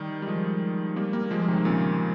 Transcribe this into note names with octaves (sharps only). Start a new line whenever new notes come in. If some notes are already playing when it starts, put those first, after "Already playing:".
Already playing: D#3 G3
G3
F3 G#3
G3 A#3
G3 A#3
F3 G#3
F3
C3 D#3
A#2 C#3